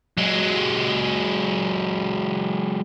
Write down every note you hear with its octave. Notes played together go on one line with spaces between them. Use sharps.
F#3 G#3